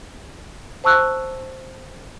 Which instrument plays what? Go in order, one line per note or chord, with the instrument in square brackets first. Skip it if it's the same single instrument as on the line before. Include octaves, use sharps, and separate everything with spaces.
[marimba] C5 A5 C#6 E6 F#6